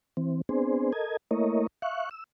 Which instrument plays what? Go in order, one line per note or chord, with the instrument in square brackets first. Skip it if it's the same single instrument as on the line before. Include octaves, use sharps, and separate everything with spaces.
[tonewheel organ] E3 C4
B3 C4 D4 G#4 C5
A4 A#4 D#5 G#6
A3 A#3 E4 A#4 C#5 D#5
E5 F5 C#6 F#6
E6